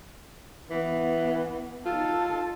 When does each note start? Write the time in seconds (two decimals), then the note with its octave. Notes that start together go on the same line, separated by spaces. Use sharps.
0.70 E3 B3
1.86 D#4 F4 A4